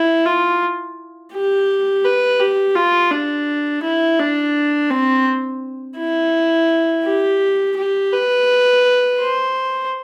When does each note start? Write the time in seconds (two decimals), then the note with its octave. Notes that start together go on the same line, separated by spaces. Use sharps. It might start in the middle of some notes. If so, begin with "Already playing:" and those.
Already playing: E4
0.26 F4
1.33 G4
2.04 B4
2.40 G4
2.75 F4
3.11 D4
3.83 E4
4.19 D4
4.90 C4
5.97 E4
7.05 G4
7.77 G4
8.13 B4
9.20 C5